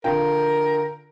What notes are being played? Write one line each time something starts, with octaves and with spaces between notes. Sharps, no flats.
D3 F4 A#4 G5